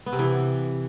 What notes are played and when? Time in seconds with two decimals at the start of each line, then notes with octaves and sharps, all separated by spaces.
0.06 B3
0.13 C3
0.19 E3